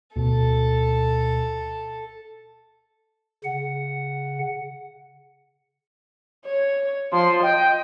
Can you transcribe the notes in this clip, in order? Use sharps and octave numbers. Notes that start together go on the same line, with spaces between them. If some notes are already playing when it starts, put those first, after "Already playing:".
D2 B2 A4
C#3 F#5
C#5
F3 C6
D#5 G5